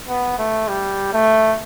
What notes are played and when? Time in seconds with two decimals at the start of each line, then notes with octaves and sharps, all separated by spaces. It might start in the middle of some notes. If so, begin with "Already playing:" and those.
0.08 B3
0.38 A3
0.68 G3
1.13 A3